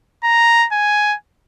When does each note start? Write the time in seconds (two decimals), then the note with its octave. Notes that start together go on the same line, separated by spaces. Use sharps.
0.24 A#5
0.72 G#5